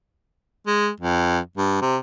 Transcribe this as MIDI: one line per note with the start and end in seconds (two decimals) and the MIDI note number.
0.68 0.89 56
1.01 1.39 41
1.58 1.80 43
1.82 1.97 48